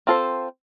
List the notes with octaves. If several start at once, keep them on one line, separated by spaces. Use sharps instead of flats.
C4 F4 A4 C5